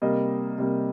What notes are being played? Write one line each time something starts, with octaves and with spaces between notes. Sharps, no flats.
C3 G3 A#3 D#5
C3 G3 A#3